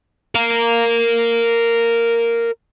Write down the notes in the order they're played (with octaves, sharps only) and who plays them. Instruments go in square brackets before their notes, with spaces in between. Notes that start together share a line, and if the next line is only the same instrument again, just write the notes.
[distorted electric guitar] A#4 F5